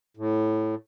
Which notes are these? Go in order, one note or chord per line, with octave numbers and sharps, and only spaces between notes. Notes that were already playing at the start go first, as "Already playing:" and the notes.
A2